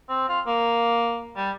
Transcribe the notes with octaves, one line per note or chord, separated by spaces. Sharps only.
C4
F4
A#3
G3